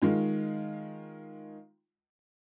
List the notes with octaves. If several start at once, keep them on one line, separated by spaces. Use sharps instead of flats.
D#3 G#3 F4